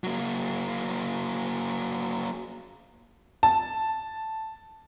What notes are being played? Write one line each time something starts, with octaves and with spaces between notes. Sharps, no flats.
F#3 A#3
A5